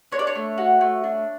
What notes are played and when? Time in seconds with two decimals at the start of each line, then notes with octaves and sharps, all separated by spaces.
0.12 D4 C#5
0.19 D5
0.27 C#5
0.35 A3
0.58 F#4
0.81 A3
1.04 D4